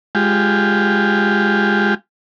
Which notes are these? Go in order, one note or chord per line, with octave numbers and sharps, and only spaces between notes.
G#3 F4 G4